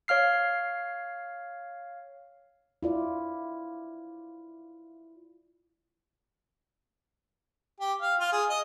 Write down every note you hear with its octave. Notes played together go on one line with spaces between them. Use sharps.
C#5 F5 F6 C7
E4 F4 D5
G4
F5
F4
G#4
D#5